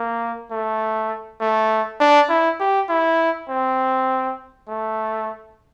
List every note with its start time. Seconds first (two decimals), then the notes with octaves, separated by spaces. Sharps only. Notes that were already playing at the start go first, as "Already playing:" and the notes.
Already playing: A#3
0.51 A3
1.41 A3
2.00 D4
2.29 E4
2.60 G4
2.89 E4
3.49 C4
4.69 A3